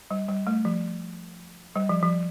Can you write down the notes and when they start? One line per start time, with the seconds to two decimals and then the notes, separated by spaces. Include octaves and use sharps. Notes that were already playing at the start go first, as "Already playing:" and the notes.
0.11 G3
0.28 G3
0.47 A3
0.65 F3
1.76 G3
1.89 F3
2.03 F3